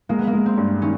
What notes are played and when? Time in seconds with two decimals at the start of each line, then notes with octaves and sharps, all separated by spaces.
0.09 G#3 A#3
0.19 B3
0.27 A#3
0.33 G#3
0.46 C4
0.58 G2
0.82 D#3 C#4